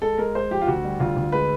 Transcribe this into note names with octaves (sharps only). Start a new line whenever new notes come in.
G#3 A4
G#3 A#4
G#3 C5
F3 G4
F4
D2 F#4
G3
D2 F4
D2
G#3 B4